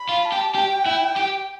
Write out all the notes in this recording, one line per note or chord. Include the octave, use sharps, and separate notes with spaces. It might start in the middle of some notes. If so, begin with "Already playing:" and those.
Already playing: B5
F4
A5
G4
G4 G5
E4
G4